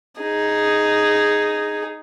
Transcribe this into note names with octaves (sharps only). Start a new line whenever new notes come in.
D#4 G#4